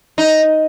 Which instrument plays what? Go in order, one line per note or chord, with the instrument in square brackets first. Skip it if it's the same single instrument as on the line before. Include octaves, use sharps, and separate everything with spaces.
[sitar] D#4